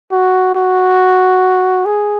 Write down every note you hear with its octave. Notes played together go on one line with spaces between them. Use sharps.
F#4
F#4
G#4